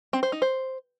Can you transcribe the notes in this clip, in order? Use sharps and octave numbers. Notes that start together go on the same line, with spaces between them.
C4
C5
D#4
C5